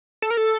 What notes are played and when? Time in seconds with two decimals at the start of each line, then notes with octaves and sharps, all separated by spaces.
0.22 A4
0.31 A#4
0.37 A4